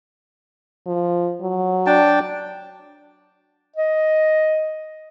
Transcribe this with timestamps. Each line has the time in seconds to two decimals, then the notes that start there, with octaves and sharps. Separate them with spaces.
0.87 F3
1.41 F#3
1.86 D4 G5 A5
3.76 D#5